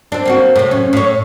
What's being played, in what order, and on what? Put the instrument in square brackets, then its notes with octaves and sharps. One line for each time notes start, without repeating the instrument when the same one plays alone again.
[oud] C4 D4
A#3 C4 F#4
A2 C3
F#2 C#4
A2 C#5